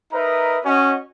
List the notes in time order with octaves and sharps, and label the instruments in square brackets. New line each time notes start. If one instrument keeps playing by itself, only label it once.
[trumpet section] D#4 A#4 B4 D#5 E5 A#5
C#4 F#4 D#5